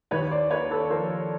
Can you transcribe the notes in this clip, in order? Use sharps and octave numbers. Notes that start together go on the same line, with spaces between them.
D#2 B4 C#5
C5 D5
A#3 B4 C#5
A4 B4
F3 A#4 C5